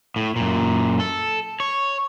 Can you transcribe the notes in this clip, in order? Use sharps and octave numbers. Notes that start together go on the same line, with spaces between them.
A2
F#2 A#2
A4
C#5